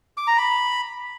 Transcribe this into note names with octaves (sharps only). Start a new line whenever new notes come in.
D6
A#5
B5